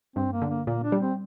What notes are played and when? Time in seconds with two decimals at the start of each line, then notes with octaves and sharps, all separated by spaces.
0.16 G2 C4
0.33 A#3
0.42 D3
0.50 A#3
0.67 A#2 A#3
0.84 D4
0.92 G3
1.02 C4